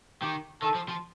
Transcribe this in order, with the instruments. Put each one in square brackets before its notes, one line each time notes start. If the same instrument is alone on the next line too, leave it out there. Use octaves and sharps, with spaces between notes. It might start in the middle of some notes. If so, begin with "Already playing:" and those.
[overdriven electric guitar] D#3 [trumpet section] G4
[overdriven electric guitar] D#3 [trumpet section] A4
[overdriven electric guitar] F3
F3